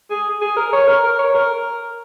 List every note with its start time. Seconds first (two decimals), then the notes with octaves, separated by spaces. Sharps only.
0.10 G#4
0.41 G#4
0.56 A#4
0.73 C#5
0.87 A#4
1.04 A#4
1.19 C#5
1.35 A#4